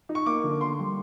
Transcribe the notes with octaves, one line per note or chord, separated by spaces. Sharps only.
D#4
C#6
A#3 D6
D3
A#3 C6
G3